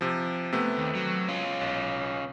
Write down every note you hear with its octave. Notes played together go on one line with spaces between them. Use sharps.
C3 F3
C3 A3 B3
D#2
F#3
C#4 F4
B1